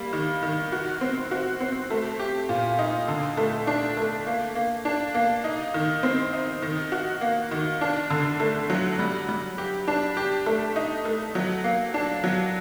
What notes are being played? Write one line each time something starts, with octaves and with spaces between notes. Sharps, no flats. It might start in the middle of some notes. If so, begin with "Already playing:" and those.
Already playing: G3 A#3
D#3
D#3
F#4
C4
F#4
C4
A3
G4
A#2
D#4
D3
A3
D4
A3
A#3
A#3
D4
A#3
D#4
D#3
C4
D#4
D#3
F#4
A#3
D#3
D4
D3
A3
F#3
G3
G3
G4
D4
G4
A3
D#4
A3
F#3
A#3
D4
F#3